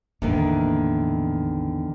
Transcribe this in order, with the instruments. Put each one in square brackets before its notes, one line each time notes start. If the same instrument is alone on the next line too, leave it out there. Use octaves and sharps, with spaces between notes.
[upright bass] A1 A#3 [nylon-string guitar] E2 D3 D#3